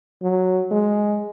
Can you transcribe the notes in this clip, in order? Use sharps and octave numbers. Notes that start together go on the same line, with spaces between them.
F#3
G#3